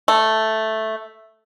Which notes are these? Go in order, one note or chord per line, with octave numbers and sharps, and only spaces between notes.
A3